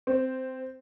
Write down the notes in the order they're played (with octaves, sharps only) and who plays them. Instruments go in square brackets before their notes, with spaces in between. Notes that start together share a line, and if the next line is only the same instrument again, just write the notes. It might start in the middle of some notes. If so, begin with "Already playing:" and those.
[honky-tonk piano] C4